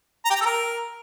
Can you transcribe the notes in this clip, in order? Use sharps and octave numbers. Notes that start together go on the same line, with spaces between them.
A#5
G4
A#5
A4
A#4